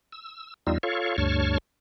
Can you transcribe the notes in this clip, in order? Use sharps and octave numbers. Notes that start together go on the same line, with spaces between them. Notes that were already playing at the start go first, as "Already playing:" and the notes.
E6
E2 G3 D#4 F4 E6
F4 A4 C#5 F5 C#6
D2 G2 C#5 A5 C#6 F6